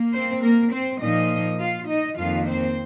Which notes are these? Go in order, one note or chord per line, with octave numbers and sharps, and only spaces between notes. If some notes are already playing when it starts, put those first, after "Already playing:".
Already playing: A#3
C4 C5
A#3 A#4
C4 C5
A#2 F3 A#3 D#4 D#5
F4 F5
D#4 D#5
F2 D#3 A#3 F4 F5
C4 C5